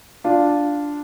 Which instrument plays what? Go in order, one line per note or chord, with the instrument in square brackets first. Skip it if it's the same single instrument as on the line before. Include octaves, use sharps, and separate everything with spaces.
[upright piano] D4 F4